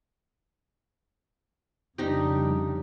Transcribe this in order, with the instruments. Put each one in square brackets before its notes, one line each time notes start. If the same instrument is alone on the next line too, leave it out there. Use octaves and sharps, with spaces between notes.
[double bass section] F2 C#3 G3 [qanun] D4 D#4 G4